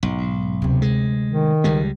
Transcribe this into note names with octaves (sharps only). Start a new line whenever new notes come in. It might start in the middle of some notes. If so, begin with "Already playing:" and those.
B1 G#2
D2 C3
G#3
D#3
C#2 G3 G#3